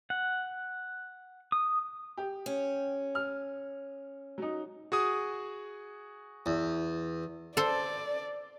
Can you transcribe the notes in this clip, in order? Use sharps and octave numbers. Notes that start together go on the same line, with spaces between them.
F#5
D#6
G4
C#4
F6
F#3 D#4
F#4 G#4 D#6
E2
A4 C5 D5